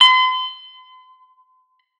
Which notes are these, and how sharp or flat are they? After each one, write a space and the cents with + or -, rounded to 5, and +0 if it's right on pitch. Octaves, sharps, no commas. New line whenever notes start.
C6 -40